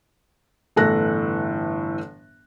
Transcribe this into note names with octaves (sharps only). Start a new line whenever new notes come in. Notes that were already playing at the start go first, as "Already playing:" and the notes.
G1 A2 E3 A4 F#6 A#6